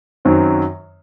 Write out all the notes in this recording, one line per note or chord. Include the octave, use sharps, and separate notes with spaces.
F#2 D#3 F#3 C4